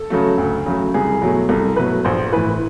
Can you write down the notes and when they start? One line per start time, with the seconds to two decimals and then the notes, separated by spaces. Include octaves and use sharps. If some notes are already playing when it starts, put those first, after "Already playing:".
Already playing: A4
0.10 C#3 F#3 A3
0.38 D2
0.66 C#3 F#3 A3
0.94 C2 G#4
1.22 B2 F#3 A3
1.49 C2 A4
1.76 B2 F#3 A3 B4
2.05 A#1 C5
2.33 A2 E3 B4